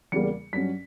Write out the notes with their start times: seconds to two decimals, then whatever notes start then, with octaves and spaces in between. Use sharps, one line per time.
0.12 E2 C#3 G3 A#3 C#7
0.53 G2 F#3 C#4 B6